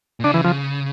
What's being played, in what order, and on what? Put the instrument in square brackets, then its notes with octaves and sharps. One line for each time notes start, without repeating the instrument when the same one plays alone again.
[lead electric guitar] A#2
[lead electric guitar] C#3 [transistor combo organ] D4
[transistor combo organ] E3
F3